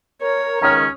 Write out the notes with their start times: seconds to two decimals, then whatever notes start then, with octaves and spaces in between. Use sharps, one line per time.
0.22 A#4 C#5
0.62 C#2 D#3 C#4 A#5 D#6 F6